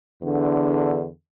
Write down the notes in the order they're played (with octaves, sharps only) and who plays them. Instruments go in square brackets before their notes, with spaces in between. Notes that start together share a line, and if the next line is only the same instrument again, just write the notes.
[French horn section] E2 D3